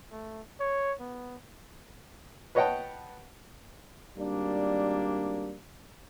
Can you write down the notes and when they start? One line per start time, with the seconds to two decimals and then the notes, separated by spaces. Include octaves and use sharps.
0.11 A3
0.60 C#5
1.00 B3
2.55 B4 C#5 D#5 F#5 G5 A5
4.17 G#1 G3 A#3 D4